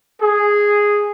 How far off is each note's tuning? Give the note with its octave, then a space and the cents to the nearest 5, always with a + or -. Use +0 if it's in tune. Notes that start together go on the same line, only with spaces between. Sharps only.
G#4 -5